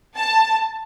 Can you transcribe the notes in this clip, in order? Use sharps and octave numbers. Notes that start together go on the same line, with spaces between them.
A5